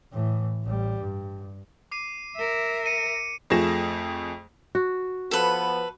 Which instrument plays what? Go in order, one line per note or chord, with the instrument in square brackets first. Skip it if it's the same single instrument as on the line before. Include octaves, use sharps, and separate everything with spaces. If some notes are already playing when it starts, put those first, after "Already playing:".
[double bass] A2 E3
A1 G3
G2
[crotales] D6 C7 D#7
[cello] A#4 E5
[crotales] C#7 D#7
[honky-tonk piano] F2 F3 A3 G#4 A#6 E7
[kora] F#4
[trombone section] F3 B3 [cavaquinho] A4 B4